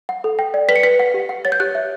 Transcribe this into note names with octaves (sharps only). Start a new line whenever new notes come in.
F#5
A4
G5
D5
B4 B6
C#7
B4 B6
F#5
G4
F#5
C#5 A6
G6
G4 F#6
E5